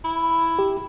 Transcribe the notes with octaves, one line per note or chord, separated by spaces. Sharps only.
E4
G4